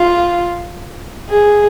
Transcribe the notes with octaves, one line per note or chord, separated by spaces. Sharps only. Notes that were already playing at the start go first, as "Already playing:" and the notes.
Already playing: F4
G#4